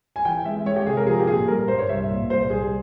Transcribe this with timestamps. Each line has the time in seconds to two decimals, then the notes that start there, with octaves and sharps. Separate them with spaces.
0.16 G#5
0.25 E3 G5
0.45 G#3 E5
0.66 G#3 C#5
0.76 G4
0.86 C3 G#4
0.97 A#4
1.07 F3 G#4
1.20 G4
1.27 A#2 G#4
1.48 G3 A#4
1.68 G2 C5
1.79 C#5
1.89 C2 E5
2.10 A#2
2.30 C2 C5
2.50 C2 G#4